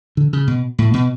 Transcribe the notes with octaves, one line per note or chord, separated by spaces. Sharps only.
D3
C#3
B2
A2
B2